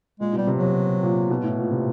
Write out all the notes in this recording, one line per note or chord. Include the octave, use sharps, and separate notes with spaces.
A#2 G#3
B2
G3
C3
F#3
C3
A#2
B2
A2
A#2
C3